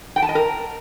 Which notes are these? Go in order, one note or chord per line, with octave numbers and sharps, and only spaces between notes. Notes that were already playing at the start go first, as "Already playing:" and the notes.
G5
A5
D#5
A#4